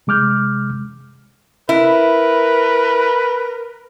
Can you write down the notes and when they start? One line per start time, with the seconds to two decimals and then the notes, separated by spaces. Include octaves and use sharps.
0.07 C3 G#3 D6 F6 G6
1.69 E4 A#4 B4